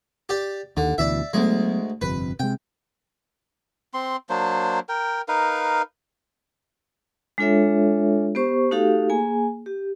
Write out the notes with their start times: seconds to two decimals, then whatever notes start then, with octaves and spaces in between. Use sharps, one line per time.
0.29 G4 D5
0.77 D#2 D3
0.98 D2 B2 E3 D5 E5
1.33 D2 F#3 G#3 A#3 B3
2.01 G1 F2 C3 B4
2.40 C3 G#3 G5
3.94 C4 C6
4.29 F#3 A#3 D4 C5
4.89 A#4 G5
5.28 D#4 A#4 B4 F5
7.38 G#3 D4 F4 A4 C#5 E5
8.35 B3 G4 C5 C#6
8.71 A3 D#4 F#4 G4 A4 F5
9.10 A#3 G#4 G#5
9.66 G4